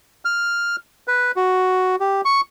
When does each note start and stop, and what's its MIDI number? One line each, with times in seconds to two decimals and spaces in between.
0.25 0.76 89
1.08 1.32 71
1.36 1.96 66
2.00 2.21 67
2.25 2.41 85